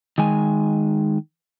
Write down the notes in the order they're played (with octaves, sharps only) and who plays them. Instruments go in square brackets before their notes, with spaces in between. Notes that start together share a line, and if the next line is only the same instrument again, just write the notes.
[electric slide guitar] D#3 G#3 G#5